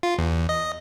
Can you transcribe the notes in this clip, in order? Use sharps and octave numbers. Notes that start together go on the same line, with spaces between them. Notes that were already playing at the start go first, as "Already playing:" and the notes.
F4
E2
D#5